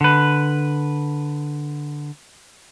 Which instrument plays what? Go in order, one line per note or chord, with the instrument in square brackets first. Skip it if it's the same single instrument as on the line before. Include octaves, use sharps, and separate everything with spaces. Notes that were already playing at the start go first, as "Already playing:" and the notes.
[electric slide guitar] D3 B4